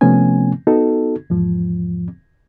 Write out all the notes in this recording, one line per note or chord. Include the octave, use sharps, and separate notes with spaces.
C3 F3 A3 B3 C#4 G#5
B3 D#4 F#4 A4
E2 G#2 F3